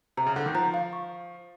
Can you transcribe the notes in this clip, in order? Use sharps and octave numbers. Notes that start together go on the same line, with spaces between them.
C3 A#5
C#3
D3 F#5
D#3
F3 A#5
F5
C#6